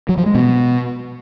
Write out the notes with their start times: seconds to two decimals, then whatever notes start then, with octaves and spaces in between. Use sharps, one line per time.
0.09 F#3
0.17 F3
0.26 G#3
0.35 B2